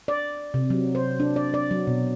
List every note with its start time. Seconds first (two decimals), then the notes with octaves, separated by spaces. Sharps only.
0.08 D5
0.54 C3
0.70 F#3
0.95 C5
1.20 D4
1.36 D5
1.54 D5
1.71 F#3
1.87 B2